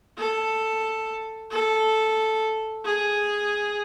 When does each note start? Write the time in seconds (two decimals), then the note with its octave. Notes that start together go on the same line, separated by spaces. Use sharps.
0.18 A4
1.51 A4
2.85 G#4